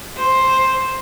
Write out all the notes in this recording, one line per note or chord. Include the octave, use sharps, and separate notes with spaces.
C5